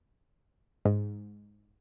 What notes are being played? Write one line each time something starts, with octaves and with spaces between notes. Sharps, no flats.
G#2